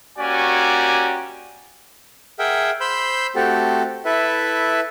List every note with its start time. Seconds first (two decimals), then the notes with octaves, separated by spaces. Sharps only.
0.18 A#3 C#4 F#4 G4 D5 G#5
2.39 G#4 A#4 E5 F#5 G5
2.81 C5 B5 C6 E6 G6
3.36 A3 C4 F#4 G4 A4
4.05 E4 A4 B4 E5